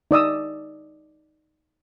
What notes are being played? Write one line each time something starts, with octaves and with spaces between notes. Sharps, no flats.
D#4 D5 D#6 E6